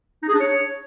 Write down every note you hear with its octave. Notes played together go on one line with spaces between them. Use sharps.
D#4
G#4
D4
C#5